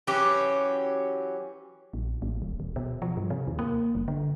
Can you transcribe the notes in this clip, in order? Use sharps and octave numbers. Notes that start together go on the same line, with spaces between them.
E3 F#3 C#4 G4
A#1
A1
D1
D1
B2
F3
G2
C3
D#2
A#3
F#1
D3